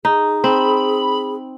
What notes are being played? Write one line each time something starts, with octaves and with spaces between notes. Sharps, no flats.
D#4 G#4
C4 B5